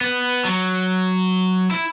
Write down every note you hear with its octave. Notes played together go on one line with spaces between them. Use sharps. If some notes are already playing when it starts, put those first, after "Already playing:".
B3
F#3
E4